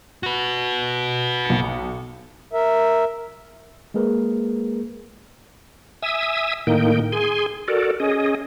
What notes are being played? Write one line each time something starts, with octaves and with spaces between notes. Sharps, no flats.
F#4 B4
B1 C#7
A#4 E5
G#3 A#3 G#4 A#4 B4
E5 G#5 D#6 E6
A2 D#3 A#3 D#4 G5
G#4 G#5 C6
F#4 A4 A#4 D5
C#4 G#4 D#5